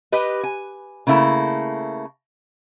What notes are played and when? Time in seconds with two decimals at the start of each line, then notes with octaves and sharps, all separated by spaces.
0.12 G4 B4 D#5
0.43 G#5
1.07 C#3 A3 A#3 E4